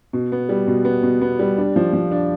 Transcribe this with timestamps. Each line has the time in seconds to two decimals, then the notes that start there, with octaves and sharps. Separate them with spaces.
0.13 B2
0.32 B3
0.49 G3
0.67 B2
0.85 B3
1.03 B2
1.22 B3
1.39 G3
1.58 D4
1.76 F3
1.93 F3
2.11 D4